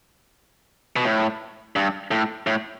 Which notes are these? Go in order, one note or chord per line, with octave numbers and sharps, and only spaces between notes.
B2
A2
G2
A2
A2